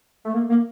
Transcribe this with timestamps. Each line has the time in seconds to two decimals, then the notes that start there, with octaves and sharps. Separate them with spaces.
0.25 A3
0.33 A#3
0.49 A#3